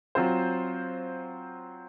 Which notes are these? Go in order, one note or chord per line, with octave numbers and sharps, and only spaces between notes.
F#3 C4 F4 C5